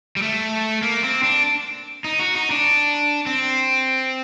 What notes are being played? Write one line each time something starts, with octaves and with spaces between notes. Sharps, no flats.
G3
A3
A#3
C4
D4
D#4
F#4
D#4
D4
C4